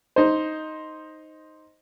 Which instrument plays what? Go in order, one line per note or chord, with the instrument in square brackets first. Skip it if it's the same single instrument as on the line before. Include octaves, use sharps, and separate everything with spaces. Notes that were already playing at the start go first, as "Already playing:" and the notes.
[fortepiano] D#4 C5